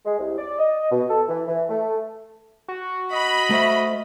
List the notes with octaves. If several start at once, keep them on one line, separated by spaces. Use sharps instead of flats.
G#3
C2
D5
D#5
B2
A4
E3
E3
A3
F#4
D#5 B5
A3 C5 E5